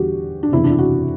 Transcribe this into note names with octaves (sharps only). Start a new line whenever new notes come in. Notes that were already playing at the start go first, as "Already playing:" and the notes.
Already playing: E2 D3 G3 F#4 G4
D4
F#1 E2 C3 E4
D4
E4
F#4